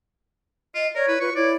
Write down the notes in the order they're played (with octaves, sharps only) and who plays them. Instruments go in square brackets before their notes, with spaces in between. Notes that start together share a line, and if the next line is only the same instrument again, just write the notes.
[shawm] F4 [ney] D#5
[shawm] A#4 [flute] C#5 [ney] D5
[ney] E4 [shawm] B4
[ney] F4 [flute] B4 [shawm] C#6
[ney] E4 [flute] C#5 [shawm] D5